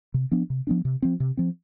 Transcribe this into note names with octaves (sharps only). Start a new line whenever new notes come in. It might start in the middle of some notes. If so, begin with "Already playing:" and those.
C3
F3 B3 D4
C3
F3 B3 D4
C3
F3 C4
C3
F3 C4